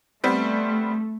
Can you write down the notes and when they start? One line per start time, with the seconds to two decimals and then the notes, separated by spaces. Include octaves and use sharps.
0.24 G3 A3 B3 C4